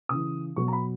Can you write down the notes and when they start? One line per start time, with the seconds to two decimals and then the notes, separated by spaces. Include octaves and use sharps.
0.09 C#3 E3 D#6
0.56 B2 F#3 C#6
0.68 A#5
0.73 B5